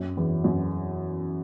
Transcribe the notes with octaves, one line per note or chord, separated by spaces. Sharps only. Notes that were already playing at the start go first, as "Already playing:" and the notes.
Already playing: F#2
E2
F#2